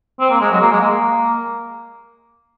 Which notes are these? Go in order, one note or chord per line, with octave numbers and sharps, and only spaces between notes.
C4
A#3
G#3
F#3
A#3
G#3
A#3